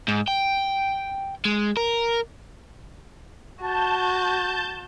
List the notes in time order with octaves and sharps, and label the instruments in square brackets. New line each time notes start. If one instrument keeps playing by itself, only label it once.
[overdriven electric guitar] G#2
G5
G#3
A#4
[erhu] F#4 [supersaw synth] A5 G6